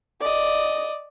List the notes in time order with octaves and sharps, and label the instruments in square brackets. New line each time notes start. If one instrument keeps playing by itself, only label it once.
[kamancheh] D5 D#5